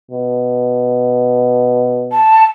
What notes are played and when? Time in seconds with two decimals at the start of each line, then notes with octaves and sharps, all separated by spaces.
0.11 B2
2.12 A5